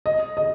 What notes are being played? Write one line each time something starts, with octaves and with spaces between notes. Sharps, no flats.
D#5
D#5